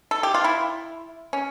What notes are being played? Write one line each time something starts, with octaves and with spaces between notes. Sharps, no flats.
A4
G4
F4
E4
C#4